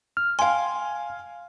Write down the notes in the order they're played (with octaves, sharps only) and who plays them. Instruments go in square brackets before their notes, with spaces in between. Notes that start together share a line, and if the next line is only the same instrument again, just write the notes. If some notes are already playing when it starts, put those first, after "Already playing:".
[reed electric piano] F6
[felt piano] F5 G#5 [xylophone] G5 C6